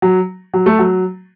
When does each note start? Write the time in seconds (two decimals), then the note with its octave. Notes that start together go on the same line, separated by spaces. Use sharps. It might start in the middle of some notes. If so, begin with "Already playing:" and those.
0.02 F#3
0.54 F#3
0.66 A3
0.79 F#3